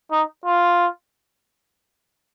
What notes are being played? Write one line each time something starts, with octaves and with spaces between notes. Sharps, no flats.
D#4
F4